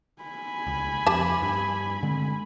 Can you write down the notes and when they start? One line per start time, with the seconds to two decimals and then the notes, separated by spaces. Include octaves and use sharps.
0.22 G#5 B5
0.67 C#2
1.07 F2 G4 A5
1.42 G2
2.03 D3 G#3 C4